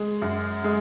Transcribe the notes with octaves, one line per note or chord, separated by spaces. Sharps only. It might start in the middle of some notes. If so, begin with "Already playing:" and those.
Already playing: G#3
F#2
G#3